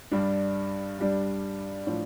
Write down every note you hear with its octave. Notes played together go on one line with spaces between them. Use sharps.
G2 G3 D4
G2 G3 D4
A2 F3 D4